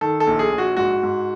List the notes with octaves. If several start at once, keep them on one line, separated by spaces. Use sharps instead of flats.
D#3 A4
A4
A#1
G#4
A#1
F#4
G#2 F#4
G#2